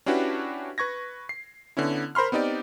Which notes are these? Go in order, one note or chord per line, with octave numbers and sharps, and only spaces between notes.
C#4 D4 E4 F#4 G4 B4
B4 C#6 G#6 A#6
C7
D3 B3 C#4 E4
A#4 C5 B5 C6 F6
B3 C4 D#4 G4 D5